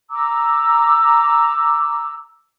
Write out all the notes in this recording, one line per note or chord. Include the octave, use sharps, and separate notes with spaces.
A#5 D6 E6